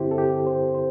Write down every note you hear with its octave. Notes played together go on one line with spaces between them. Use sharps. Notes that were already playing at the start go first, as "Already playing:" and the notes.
Already playing: G2 D3 C4 E4 G4 C5
A4
G4
C5
C5